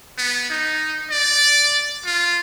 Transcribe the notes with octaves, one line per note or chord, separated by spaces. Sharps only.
B3
D#4
D5
F4